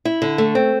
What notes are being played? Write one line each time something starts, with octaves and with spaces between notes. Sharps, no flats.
E4
D3
A3
C4